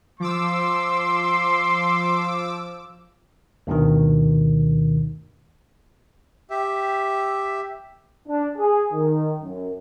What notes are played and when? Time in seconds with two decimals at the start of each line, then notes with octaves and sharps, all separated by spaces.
0.20 F3 C6 D6 E6
3.67 D2 G2 B2 D#3
6.50 G4 E5
8.27 D4
8.57 G#4
8.91 D#3
9.41 F#2